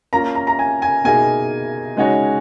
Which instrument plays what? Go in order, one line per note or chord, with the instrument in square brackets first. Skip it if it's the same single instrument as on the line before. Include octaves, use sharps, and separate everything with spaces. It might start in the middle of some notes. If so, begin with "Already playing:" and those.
[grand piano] A#3 C#4 F4 [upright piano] A#5
[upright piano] A#5
A#5
G#5
G#5
[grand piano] B2 A#3 D#4 G#4 [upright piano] G#5
[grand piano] C#3 G#3 D#4 F#4 C#5